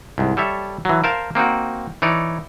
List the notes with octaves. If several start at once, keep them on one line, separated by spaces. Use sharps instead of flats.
C2 G#2
G3 A4 C#5 E5
E3 F#3
A#4 C5 F5 A5
A#3 C4 D#4 F#4
E3 D#4 C#5 D5